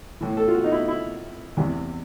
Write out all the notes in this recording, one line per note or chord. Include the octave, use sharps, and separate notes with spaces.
A2 E3
A4
F4
F#4
D#4
E4
E4
E2 C3 E3